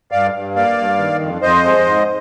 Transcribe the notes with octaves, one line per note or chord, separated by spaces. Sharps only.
G2 D5 F5
G2
A#3 D5 F5
G2
D#3
F2
F2 C5 D#5
G#3
G#2